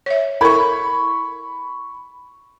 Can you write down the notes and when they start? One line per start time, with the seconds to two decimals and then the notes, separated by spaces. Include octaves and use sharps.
0.06 C#5 E5
0.41 E4 A4 A#4 B5 C#6